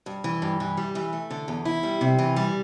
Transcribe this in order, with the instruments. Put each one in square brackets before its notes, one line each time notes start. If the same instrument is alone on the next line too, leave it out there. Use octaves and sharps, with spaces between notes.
[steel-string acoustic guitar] G2
E3
G2
E3
G3
E3
A3
D3
E2
E4
G3
C3
E3
G3